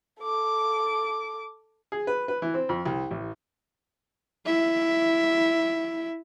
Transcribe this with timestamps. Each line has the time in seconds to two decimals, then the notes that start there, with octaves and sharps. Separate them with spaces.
0.21 A4 D6
1.92 G#4
2.07 B4
2.28 B4
2.42 E3
2.54 C4
2.69 F2
2.86 C2
3.11 A1
4.46 E4 E5